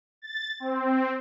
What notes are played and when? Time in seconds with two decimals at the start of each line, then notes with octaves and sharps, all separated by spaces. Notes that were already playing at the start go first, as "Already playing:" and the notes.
0.22 A6
0.60 C4